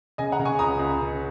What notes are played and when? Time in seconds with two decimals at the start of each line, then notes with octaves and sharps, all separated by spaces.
0.18 C#3 D#5 G#5
0.32 F#5 A#5
0.39 C#3
0.45 G#5 C#6
0.59 C#2 A#5 D#6
0.79 C#2
0.99 C#3